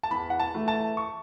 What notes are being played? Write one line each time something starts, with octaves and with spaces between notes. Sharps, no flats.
A5
E2 B5
F#5
A5
E3 A3
A5
C#6